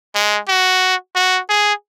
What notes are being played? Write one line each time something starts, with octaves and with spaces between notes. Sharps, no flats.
G#3
F#4
F#4
G#4